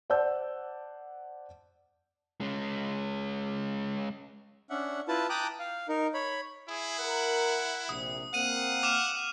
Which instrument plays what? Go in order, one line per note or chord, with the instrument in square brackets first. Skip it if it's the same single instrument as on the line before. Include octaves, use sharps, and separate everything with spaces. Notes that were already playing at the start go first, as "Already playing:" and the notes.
[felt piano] C5 D5 F#5 A5 E6 G6
[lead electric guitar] G#3 C#4
[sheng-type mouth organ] C#4 D4 E5 F#5
E4 F4 B4 A5
G5 A5 A#5 D6 D#6 F#6
F5
D#4 A#4
C#5 B5
[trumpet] E4 [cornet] G#4
[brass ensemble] A#4 [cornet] F#5
[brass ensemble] A#1 C3 [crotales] D#6
[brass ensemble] A#3 C4 [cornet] F5 [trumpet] F#5 [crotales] D#7
[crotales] D6 F6 E7